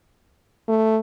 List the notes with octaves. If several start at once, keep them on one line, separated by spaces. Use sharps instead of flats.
A3